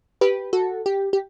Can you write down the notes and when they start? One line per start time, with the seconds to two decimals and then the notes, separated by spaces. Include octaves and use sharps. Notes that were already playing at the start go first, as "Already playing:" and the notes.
0.21 G4 B4
0.53 F#4 A4
0.86 G4
1.13 G4